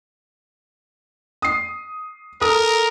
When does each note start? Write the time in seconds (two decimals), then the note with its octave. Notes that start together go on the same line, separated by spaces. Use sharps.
1.42 D#6 C7
2.41 A4 A#4 D#6